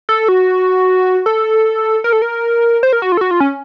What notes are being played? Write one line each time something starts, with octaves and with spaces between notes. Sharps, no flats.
A4
F#4
A4
A#4
A4
A#4
C5
A#4
F#4
F4
A4
F#4
F4
C#4